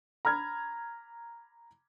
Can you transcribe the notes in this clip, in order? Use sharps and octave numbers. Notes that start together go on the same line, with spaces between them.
A#5 B5 F6 G#6